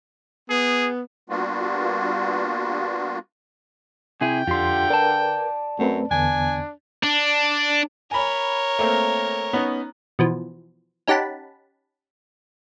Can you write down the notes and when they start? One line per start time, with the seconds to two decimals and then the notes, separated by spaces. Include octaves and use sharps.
0.50 B3 G#4
1.30 G3 A#3 B3 D4 F4 F#4
4.21 C3 E4 G#4 G5
4.47 F2 D3 F4 G4 C6
4.90 A#4 B4 D5 A5
5.79 F#2 A3 C4 B4
6.11 E2 D3 B3 D4 G#5
7.03 D4
8.11 A#4 C#5 G#5 B5
8.79 A3 A#3 C4
9.53 B3 C#4 D#4
10.19 B2 E3 F3
11.07 C#4 D#4 G4 F#5 A5 B5